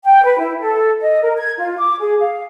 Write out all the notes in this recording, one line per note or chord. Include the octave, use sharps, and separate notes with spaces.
G5
B4
E4
A4
D#5
A#4
G#6
F4
D6
G#4
F5